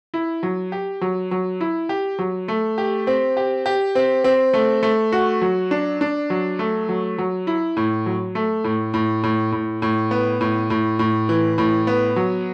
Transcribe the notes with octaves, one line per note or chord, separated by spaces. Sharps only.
E4
F#3
G4
F#3
F#3
E4
G4
F#3
A3
G4
C4
G4
G4
C4
C4
A3
A3
F#4
F#3
D4
D4
F#3
A3
F#3
F#3
E4
A2
F#3
A3
A2
A2
A2
A2
A2
B3
A2
A2
A2
E3
A2
B3
F#3